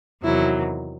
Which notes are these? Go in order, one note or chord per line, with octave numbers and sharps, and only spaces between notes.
E2 C3 D#3 F#3 E4